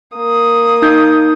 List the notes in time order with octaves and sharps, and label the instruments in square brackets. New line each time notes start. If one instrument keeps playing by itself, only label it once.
[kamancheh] A#3 D#6
[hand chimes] D#4 G6